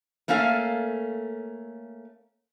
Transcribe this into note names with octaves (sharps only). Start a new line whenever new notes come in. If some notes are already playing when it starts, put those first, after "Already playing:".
A3 A#3 C#4 A4 F5